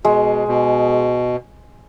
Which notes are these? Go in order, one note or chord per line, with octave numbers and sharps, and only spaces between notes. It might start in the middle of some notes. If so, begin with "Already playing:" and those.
B2 G#3
B2